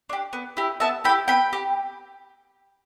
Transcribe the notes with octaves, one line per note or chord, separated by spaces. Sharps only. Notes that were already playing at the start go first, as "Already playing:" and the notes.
D4 G4
B3
E4 G4
B3 E5 A5
E4 G4 G5 B5
B3 G5 B5
G4